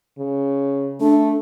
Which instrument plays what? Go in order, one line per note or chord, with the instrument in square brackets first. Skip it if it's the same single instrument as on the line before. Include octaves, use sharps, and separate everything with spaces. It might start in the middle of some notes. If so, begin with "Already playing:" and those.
[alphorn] C#3
[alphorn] A3 [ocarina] D4